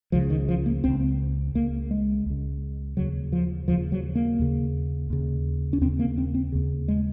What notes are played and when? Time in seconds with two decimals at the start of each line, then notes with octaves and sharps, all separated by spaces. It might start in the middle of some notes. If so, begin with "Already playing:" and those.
0.12 C#2 C#3 F3
0.30 D#3
0.49 F3
0.66 A#3
0.84 C#2 C#3 C4
1.54 C#2 C#3 A#3
1.91 G#3
2.26 C#2 C#3
2.97 D#2 C#3 F#3
3.32 F3
3.68 D#2 C#3 F3
3.92 F#3
4.15 A#3
4.39 D#2 C#3
5.10 D#2 C#3
5.73 C#4
5.81 D#2 C4
5.85 C#3
5.99 A#3
6.18 C4
6.35 C4
6.52 D#2 C#3
6.88 G#3